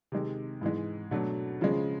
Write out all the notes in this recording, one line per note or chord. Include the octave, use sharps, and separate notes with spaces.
C3 D#3 G#3
G#2 E3 G#3
B2 F#3 A3 D4
C#3 F3 G#3